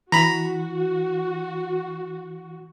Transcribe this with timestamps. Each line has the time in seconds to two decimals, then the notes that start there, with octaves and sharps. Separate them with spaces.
0.12 E3 F#4 A#5 B5